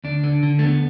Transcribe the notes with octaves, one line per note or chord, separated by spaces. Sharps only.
D2 D4
D3
D3
A3
D2 B3